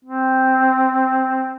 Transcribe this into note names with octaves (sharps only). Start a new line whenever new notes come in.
C4